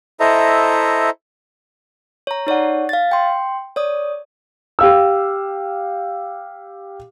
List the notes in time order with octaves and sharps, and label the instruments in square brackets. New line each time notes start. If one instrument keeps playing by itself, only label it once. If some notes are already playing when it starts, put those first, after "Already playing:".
[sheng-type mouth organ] E4 A4 C5 D#5 E5 A#5
[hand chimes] C#5 A#5
D#4 C#5 D5 F#5
F5 A6
G5 C6
C#5 D5 D#6
[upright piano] G4 F5 E6